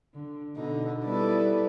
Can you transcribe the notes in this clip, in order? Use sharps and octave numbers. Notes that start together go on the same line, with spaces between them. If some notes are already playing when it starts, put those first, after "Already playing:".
D3
B2 D3 D#4
G3 B3 E4 A4 B4 D5